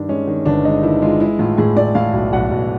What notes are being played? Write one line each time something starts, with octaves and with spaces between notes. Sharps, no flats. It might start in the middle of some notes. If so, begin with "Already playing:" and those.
Already playing: G2 D#3 D4
G#3 C#4
D#3
G1 D4
G#3 D#4
D#3 E4
G#3 F4
G#3 E4
A2 F4
A2 G#4
A2 D5
A2 F5
B1
B1 F#5
B1